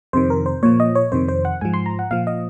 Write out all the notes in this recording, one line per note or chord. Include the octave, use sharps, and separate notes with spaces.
F2 C3 D#3 C5
A#4
C5
A#2 F3 C#5
D#5
C#5
F2 C3 D#3 C5
C5
F#5
G#2 F3 G#5
C6
A#5
F#5
A#2 F3 F5
D#5